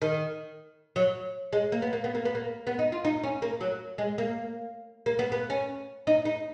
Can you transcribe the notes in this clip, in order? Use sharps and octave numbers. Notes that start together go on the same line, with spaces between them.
D#3
F#3
G#3
A#3
B3
A#3
B3
A#3
B3
A#3
B3
D#4
F4
D#4
C#4
A#3
F#3
G#3
A#3
A#3
B3
B3
C#4
D#4
D#4